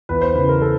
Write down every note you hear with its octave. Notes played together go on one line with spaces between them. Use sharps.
E2 B4
C5
C#3 E3 B4
A#4
A4